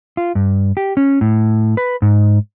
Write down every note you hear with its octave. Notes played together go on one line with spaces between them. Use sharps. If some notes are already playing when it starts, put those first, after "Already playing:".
F4
G2
G4
C#4
A2
B4
G#2